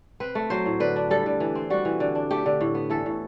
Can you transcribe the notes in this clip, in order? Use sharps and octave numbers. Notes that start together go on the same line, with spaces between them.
C4 B4
A3
F#3 C5
A2
D3 B4
D4
G3 A4
D3
E3
C4
G3 F#4
E3
D3
D4
A3 G4
D3
A2
B3
E3 A4
A2